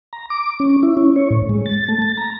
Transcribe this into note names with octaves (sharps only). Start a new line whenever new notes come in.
A#5
D6
C#4
E4
C#4
C#5
A2
G#3
A6
A3
A6
A#5